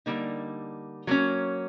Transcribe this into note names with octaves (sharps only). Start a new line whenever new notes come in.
D3 G3 A#3 D#4
F#3 A#3 C#4